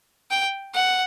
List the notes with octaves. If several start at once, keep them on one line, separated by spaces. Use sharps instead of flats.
G5
F#5